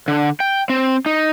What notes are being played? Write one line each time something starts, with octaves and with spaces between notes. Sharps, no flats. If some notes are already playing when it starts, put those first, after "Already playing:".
D3
G5
C4
D#4